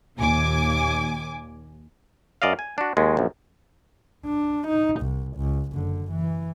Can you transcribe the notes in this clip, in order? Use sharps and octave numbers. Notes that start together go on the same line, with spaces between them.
D#2 A#2 G#5 D6
F#2 D5 D#5 F5
G#5
D4 F#4
D#2 G#3
A#1 F#2
D4
D#4
C2
C#2
F#1 D3
E3